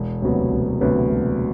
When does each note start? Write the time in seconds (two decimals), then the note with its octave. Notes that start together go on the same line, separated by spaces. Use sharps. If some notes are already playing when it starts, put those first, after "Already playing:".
Already playing: E1
0.22 D2 C3 F#3 B3
0.51 E1
0.81 D2 C3 F#3 B3
1.11 E1